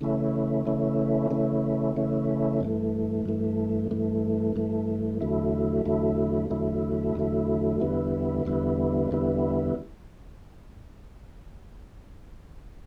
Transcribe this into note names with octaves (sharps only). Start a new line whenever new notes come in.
C#3 E3 A3 C#4 E4
C#3 E3 A3 C#4 E4
C#3 E3 A3 C#4 E4
C#3 E3 A3 C#4 E4
G2 E3 A3
G2 E3 A3
G2 E3 A3
G2 E3 A3
E2 D3 F#3 A3 E4
E2 D3 F#3 A3 E4
E2 D3 F#3 A3 E4
E2 D3 F#3 A3 E4
E2 D3 G3 B3 E4
E2 D3 G3 B3 E4
E2 D3 G3 B3 E4